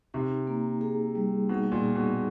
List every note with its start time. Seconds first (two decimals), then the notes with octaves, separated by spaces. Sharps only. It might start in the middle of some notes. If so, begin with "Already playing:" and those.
0.14 C3 D#4
0.47 A#3
0.81 G#4
1.15 G3
1.49 B2 D#4
1.72 A#2
1.84 G#4
1.96 B2